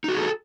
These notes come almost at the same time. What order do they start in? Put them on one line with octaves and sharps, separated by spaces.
D#4 F#4 G#4 A4